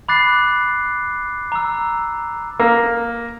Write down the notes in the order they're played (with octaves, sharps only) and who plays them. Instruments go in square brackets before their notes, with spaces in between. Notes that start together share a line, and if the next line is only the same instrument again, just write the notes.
[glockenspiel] B5 D6 F#6 A6 C7
A#5 E6
[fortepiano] A#3